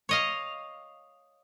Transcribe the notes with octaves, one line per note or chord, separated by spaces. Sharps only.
C#5 D#5 F5